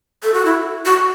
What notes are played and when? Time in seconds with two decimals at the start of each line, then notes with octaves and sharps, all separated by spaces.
0.23 A4
0.34 F#4
0.45 E4
0.85 F#4